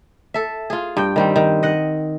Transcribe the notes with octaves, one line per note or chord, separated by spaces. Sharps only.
A4 E5
F4 G#4
G2 G5
D#3 G3 C4
D#3
D#5 F#5